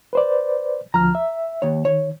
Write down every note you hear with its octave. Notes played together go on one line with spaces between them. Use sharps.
B4 C5 D5
D2 F3 A#5 F6
E5
D#2 C#5
D#3 C#5